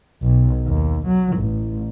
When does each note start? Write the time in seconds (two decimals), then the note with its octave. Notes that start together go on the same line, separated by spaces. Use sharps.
0.22 B1
0.66 D#2
1.07 F#3
1.38 A1